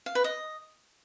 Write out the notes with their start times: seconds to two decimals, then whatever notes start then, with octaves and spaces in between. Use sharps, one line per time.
0.06 F5
0.15 B4
0.24 D#5